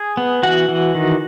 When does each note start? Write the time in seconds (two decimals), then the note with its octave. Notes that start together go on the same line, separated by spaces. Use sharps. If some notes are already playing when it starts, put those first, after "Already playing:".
Already playing: G#4
0.17 B3
0.43 E3 F#4 F#5
0.69 E3
0.95 D#3